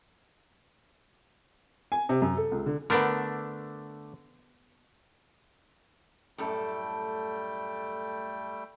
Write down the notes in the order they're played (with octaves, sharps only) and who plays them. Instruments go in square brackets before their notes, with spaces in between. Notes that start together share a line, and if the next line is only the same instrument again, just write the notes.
[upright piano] G#5
C3
F#2
A4
C#2
D3
[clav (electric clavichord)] D3 A3 D4 [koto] B3 A#4
[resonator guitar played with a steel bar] F#2 A2 A4 [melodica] G3 A3 G5